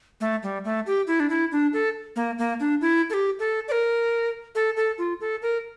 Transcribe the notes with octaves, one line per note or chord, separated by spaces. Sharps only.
A3
G3
A3
G4
E4
D4
E4
D4
A4
A#3
A#3
D4
E4
A4
G4
A4
D5
A#4
A4
A4
F4
A4
A#4